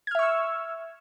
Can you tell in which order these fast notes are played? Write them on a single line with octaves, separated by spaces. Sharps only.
G#6 F6 E5 C#6 E6